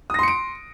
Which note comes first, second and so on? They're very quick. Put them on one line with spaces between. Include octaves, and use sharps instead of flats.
D#6 A#6 C6 C#7 D7